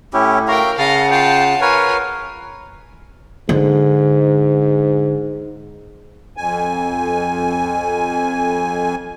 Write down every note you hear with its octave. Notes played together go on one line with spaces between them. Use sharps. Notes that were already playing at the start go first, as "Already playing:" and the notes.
A2 C#4 E4 G4
F#4 A#4 E5 F5 G5 A#5
C#3 D#5 F5 F#5 A5
F4 G5 A5
F4 A#4 B4 C#5 G#5
G#2 D3
F2 G#5